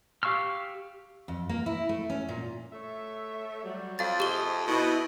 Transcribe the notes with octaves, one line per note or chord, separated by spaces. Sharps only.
G4 F5 C#6 E6 F6
F2
A#3
E4
A3
C#4
A#2
A3 C#5 E5
F#3 G3
F2 F5 A6
C3 G4 G#4 D#5 G7
B2 E4 D#5